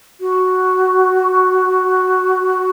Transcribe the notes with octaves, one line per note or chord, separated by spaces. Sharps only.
F#4